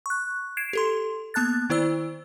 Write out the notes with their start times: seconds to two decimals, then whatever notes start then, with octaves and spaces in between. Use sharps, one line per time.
0.06 C#6 F#6
0.57 G#6 C7 D7 E7
0.73 G4 A4 C6
1.34 A#3 B3 A5 F#6 A6
1.70 D#3 E4 C5 D5 E6